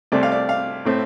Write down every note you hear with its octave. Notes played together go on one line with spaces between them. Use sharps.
C2 C3 A3 C4 D5
F5
D5
F5
A2 A3 C4